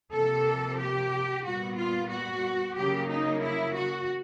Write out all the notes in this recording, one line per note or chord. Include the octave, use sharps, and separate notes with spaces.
C3 F3 A#3 A4
G4
A#2 G3 B3 F#4
F4
F#4
C#3 F#3 A#3 G4
D#4
E4
F#4